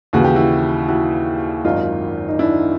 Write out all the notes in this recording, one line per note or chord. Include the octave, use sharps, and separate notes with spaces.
D#2 C#3 E3 F#4
G4
E4 F#4
E4 F#4
G#1 F#2 D#3 D#4 F4
D#4
D4 E4